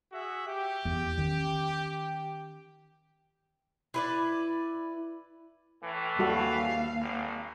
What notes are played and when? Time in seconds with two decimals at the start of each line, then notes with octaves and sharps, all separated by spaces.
0.12 F#4 G#4 E5
0.47 G4
0.85 E2
1.17 D#3 C#4
3.94 E4 B4 D5
5.82 A2 E3
6.19 D#2 G3 F#4 A4 F5
7.00 G#1